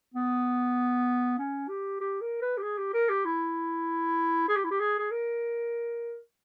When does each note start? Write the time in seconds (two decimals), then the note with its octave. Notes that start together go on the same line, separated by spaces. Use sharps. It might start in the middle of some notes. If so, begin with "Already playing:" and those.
0.14 B3
1.38 C#4
1.69 G4
2.00 G4
2.21 A#4
2.42 B4
2.58 G4
2.63 G#4
2.78 G4
2.93 A#4
3.09 G4
3.25 E4
4.48 G#4
4.56 G4
4.64 E4
4.71 G4
4.80 G#4
4.99 G#4
5.11 A#4